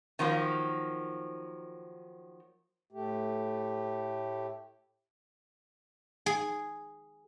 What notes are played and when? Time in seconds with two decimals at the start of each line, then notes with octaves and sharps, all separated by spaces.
0.19 D#3 F3 F#3 A#3
2.92 A2 A3 G4
6.26 G#4